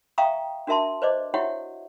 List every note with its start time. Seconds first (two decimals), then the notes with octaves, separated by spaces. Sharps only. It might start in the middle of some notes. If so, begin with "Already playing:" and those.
0.18 E5 F5 G5 A#5 C#6 D#6
0.67 D4 F#4 A#4 E5 A5 C6
1.02 B4 C5 D5 D#5 D6
1.34 E4 F#4 G4 C#5 E5 F#5